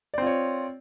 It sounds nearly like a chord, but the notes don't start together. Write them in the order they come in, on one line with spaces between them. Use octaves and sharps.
D5 C4 F4 C#5